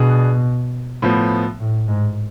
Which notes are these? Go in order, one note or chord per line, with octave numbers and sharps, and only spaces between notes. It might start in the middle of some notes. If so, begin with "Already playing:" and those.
Already playing: B2 B3 D4 G#4 D5
A2 F3 B3
A2
G#2